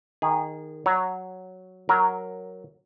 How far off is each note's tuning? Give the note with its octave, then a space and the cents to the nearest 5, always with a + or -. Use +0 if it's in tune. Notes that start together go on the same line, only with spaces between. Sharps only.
D#3 +0 G#4 -25
F#3 +0 C#5 +0
F#3 +0 A#4 +0